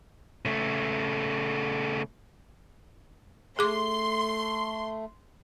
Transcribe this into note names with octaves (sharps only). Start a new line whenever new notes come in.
C#3 A3
A3 G#4 C6 D6